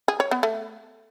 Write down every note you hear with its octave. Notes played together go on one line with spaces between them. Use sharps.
G#4
C#5
B3
A3